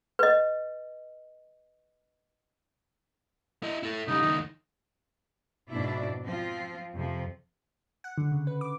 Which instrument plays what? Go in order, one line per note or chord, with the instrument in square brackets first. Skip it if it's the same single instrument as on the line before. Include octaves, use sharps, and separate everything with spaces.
[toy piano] B4 D#5
[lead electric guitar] E4 D#5
E4 A4
[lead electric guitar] C#3 G3 [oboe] D#4
[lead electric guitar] C#2 D#3
[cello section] F2 G#2 B2 D4 E4 D5
F3 C4 F4
F2 C3 F3
[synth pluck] F#5
D3
C#3
B4
D6